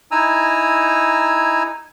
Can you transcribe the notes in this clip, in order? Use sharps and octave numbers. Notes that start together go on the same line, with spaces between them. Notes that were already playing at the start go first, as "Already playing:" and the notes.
D#4 E4 G#5 A#5 E6